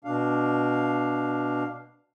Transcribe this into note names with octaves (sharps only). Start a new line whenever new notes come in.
B2 D4 F5